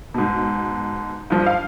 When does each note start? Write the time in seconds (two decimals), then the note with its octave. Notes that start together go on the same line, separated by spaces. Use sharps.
0.14 G#2 B2
1.30 G2 F3
1.46 F5